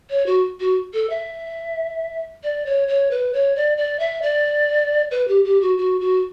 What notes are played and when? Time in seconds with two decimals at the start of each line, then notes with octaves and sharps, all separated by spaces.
0.10 C#5
0.26 F#4
0.60 F#4
0.93 A4
1.10 E5
2.43 D5
2.66 C#5
2.88 C#5
3.11 B4
3.33 C#5
3.56 D5
3.77 D5
3.99 E5
4.22 D5
5.11 B4
5.28 G4
5.44 G4
5.61 F#4
5.78 F#4
6.01 F#4